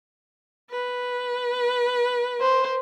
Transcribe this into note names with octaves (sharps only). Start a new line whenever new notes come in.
B4
C5